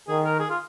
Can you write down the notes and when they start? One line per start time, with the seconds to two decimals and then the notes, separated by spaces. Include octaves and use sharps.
0.08 D#3 G#4
0.24 A#4
0.39 G#4
0.50 F4